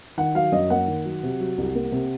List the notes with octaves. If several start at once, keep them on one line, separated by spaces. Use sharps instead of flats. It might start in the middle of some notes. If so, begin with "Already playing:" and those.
D#3 F#5
F#3 F5
F#2 D#5
A#3 F#5
D#3
F#3
C3
F#3
C2
A#3
C3